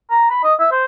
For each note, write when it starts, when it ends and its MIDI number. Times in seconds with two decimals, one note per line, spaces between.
0.11 0.29 82
0.30 0.39 83
0.44 0.54 75
0.60 0.67 76
0.72 0.85 72